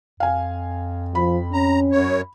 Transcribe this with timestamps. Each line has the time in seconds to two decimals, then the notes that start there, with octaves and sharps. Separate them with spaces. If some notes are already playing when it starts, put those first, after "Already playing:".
0.20 F2 F5 G#5
1.15 F3 B5
1.53 C#4 A#5
1.92 F#2 C#5